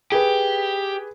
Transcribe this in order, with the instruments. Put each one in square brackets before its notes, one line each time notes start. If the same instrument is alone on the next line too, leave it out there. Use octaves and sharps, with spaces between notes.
[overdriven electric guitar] G4 [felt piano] G#4 B4